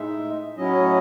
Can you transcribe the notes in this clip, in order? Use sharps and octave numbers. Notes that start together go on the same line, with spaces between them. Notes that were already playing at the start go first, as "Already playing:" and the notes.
Already playing: A2 G#3 D#4 E5
A2 F#3 C#4 E4 D#5